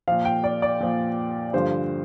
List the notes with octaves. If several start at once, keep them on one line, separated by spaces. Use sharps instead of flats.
A#2 F3 F5
G5
D5
D5
A#2 F3
G2 D3 F3 C5